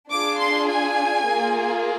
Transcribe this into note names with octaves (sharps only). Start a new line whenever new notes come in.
D4 F4 G#4 D6
C6
G#5
A#3 F4 G#4